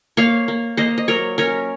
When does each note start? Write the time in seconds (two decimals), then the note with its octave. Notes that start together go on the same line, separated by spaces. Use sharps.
0.17 A#3 C#5 F5
0.48 A#3
0.77 A#3 C5 D#5
0.98 D#5
1.08 F#3 A#4 C#5
1.38 C#4 A#4 C#5